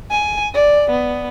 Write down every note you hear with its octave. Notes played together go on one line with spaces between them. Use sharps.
G#5
D5
B3